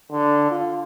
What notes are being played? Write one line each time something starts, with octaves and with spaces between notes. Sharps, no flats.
D3
F4